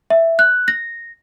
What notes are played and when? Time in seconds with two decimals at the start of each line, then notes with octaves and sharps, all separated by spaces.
0.10 E5
0.39 F#6
0.68 A#6